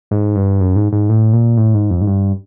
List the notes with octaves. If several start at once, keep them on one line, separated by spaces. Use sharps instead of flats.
G#2
G2
F#2
G#2
G#2
A2
A#2
A2
G#2
F2
G#2
G2